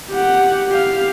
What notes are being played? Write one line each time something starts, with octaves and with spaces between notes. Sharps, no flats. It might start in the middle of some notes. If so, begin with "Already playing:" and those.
G4 F#5
G4 F5